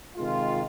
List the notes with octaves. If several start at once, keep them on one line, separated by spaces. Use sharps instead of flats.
C3 D#3 G#3 F4